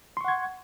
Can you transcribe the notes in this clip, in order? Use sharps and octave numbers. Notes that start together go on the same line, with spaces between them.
F#5 C6 C#6 G#6